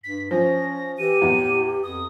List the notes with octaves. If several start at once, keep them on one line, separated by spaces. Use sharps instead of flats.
G2 B6
F3 C#4 A#6
E3 G4 D#7
E2 A2
F2 D#6